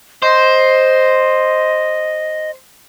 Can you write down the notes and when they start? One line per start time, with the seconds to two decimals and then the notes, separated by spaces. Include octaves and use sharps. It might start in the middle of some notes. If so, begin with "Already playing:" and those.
0.22 C5 D#5